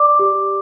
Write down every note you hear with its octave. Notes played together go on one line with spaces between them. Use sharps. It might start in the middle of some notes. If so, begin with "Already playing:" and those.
Already playing: D5 D6
G4